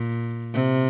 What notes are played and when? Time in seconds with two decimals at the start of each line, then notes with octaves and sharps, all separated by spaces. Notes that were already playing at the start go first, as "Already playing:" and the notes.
Already playing: A#2
0.54 C3